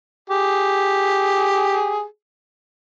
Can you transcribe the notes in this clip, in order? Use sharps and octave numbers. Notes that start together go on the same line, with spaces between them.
G4 G#4